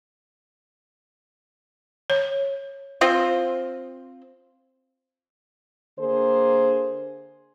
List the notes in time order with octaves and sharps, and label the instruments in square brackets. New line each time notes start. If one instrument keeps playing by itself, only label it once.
[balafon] C#5
[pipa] C4 F4 C5
[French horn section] D3 A#3 G#4 C5